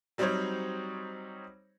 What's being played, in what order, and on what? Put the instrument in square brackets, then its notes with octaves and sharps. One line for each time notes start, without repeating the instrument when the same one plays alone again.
[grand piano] F#3 G3 C4 D#4 C5 C#5